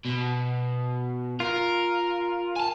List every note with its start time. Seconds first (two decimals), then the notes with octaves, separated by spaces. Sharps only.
0.05 B2
1.40 F4 A#4
2.56 G#5 A5